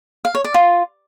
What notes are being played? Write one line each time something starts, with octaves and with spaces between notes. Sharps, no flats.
F5
C#5
D5
F4